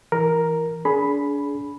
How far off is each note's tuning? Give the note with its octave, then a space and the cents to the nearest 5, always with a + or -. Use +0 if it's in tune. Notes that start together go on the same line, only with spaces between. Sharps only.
E3 +0 A#4 +0
D4 -30 G#4 +20 B5 +0